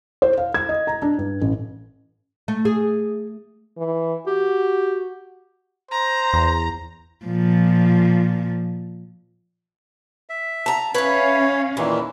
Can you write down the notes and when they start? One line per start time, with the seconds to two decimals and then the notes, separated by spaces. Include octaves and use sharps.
0.22 C5
0.38 F5
0.54 G#6
0.69 D#5
0.87 A#5
1.02 D4
1.18 G2
1.41 A1
2.48 A3
2.65 G#4
3.77 E3
4.26 F#4 G4
5.91 C5 A#5
6.33 E2
7.25 A#2 F3
10.29 E5
10.66 A5 A#5
10.94 C#4 B4 C#5 E5 F5
11.77 E2 A#2 D#3 E3